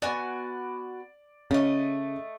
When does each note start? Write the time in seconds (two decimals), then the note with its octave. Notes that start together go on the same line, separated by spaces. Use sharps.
0.02 B3 F#4 D5 G#5
1.51 C#3 A3 D#5